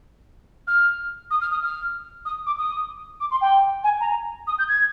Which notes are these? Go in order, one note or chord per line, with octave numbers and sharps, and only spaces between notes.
F6
D#6
F6
D#6
F6
D#6
D6
D#6
D6
C6
G5
G#5
A#5
D#6
G6
G#6